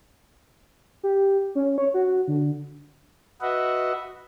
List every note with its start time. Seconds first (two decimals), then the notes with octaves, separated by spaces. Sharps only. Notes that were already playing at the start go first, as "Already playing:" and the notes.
1.03 G4
1.55 C#4
1.78 C#5
1.94 F#4
2.28 D3
3.41 F#4 B4 D#5 E5 F#5